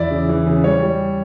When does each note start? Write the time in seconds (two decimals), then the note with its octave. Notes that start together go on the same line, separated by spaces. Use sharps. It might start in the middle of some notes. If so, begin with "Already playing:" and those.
Already playing: E2 E4 D5
0.11 C#3
0.29 E3
0.47 C#3
0.64 G3 C#5
0.82 G3